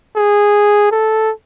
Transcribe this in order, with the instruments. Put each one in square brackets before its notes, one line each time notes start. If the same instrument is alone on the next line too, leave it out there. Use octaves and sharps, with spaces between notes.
[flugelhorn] G#4
A4